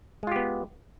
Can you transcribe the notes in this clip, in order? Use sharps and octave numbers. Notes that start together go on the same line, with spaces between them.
G#3 B3 F4 G4